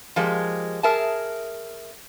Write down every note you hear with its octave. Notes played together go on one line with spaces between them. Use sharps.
F3 G#3 A#3 G4
G#4 A#4 E5 A5